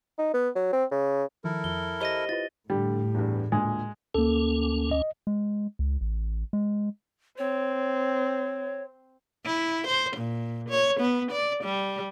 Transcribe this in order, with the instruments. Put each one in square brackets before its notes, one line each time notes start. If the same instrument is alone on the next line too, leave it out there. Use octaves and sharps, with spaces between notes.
[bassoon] D#4
B3
F#3
C4
C#3
[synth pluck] D#3 F3 [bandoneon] E4 A4 A#4
[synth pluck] F2 F3 [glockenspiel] G7
[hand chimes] G4 C5 D#5 [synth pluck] B5 [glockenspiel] A#6 D#7 G7
[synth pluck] E4 F4 B4 [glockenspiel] A6
[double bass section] A2 [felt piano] D3 [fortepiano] G3
[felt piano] E2 G2
[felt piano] D2 A#2 [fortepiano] G#3
[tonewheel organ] D2 C#4 [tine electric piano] A#3 A4
[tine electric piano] D#5
[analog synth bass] G#3
C#2
A1
G#3
[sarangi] C4 [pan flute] C#5
[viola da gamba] E4
C5
A#2
C#5
B3
D5
G3